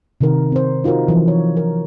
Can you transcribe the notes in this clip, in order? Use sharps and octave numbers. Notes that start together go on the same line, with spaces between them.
C3 D#3 D#4 A#4
C4 C5
D#4 F4 F#4 A#4 C5
E3 F3
C#5
A#4